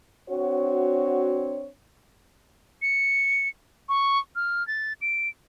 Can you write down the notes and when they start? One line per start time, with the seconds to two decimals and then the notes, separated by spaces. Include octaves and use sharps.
0.30 C4 D4 F#4 C#5
2.82 C#7
3.89 C#6
4.36 F6
4.68 A6
5.02 D7